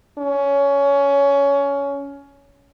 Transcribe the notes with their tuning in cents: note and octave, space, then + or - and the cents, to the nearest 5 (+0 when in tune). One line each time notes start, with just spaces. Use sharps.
C#4 +20